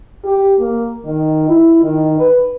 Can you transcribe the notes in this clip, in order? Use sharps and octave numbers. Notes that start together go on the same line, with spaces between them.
G4
A#3
D#3
E4
D#3
B4